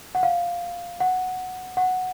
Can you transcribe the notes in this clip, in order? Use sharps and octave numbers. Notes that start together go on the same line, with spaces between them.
F#5
F5
F#5
F#5